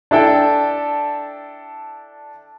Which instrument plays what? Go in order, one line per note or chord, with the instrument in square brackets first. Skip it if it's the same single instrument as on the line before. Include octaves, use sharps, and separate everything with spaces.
[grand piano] D4 E4 A4 G5